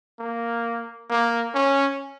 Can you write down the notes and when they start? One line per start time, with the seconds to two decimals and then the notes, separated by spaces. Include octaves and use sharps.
0.19 A#3
1.10 A#3
1.55 C#4